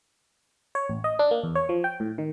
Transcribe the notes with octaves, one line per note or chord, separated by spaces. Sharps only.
C#5
A1
D#5
D4
A#3
E2
C#5
F3
G5
A2
D#3